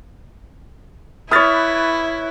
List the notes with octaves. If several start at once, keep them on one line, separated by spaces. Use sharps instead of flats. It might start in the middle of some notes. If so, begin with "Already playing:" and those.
E4 B4 C#5 D#6 F6 A6